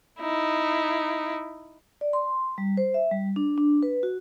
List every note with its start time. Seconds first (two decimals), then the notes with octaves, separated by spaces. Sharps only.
0.20 D#4 E4
2.01 D5
2.13 C6
2.58 G3
2.77 C5
2.94 E5
3.11 G3
3.36 D4
3.58 D4
3.83 B4
4.03 F#4